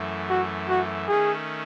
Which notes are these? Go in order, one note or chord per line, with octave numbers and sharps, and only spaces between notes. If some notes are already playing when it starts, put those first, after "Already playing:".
Already playing: F#2 E3 A3
F#4
F#4
D#3 A3 C#4 G#4